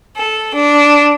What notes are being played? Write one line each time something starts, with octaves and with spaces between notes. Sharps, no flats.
A4
D4